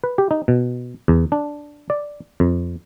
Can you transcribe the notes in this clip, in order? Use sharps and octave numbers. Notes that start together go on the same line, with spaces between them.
B4
G4
D#4
B2
E2
D4
D5
F2